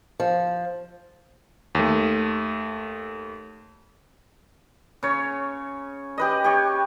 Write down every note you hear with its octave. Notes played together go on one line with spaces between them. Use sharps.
F3
D#2 A3
C#3 C#5
G4 B4 D#5
G4 C#5